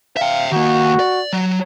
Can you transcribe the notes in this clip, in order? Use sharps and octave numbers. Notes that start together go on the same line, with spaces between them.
E5 F5 G5
D#3 A#3 F#4
D5
F#3